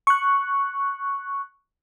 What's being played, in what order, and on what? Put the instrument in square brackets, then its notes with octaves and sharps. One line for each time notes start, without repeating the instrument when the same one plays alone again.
[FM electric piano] C#6 F#6